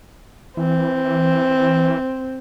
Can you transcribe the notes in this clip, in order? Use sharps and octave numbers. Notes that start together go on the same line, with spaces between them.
E3 C4